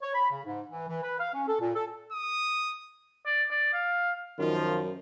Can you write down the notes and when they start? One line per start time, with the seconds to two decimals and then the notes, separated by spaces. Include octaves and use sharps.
0.01 C#5
0.14 B5
0.30 C#3
0.46 G#2
0.68 E3
0.88 E3
1.03 B4
1.19 F5
1.33 C#4
1.48 A4
1.60 A#2
1.74 A4
2.12 D#6
3.26 D5
3.50 D5
3.73 F5
4.39 F#2 D#3 F3 F4